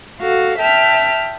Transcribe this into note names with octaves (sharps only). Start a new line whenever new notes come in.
F#4 A4 F5
E5 G5 A5 F6